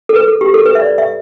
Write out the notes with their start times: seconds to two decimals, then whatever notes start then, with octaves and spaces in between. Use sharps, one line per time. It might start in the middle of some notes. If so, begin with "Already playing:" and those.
0.09 A4
0.15 B4
0.28 A4
0.41 G4
0.54 A4
0.66 B4
0.75 E5
0.81 D5
0.98 E5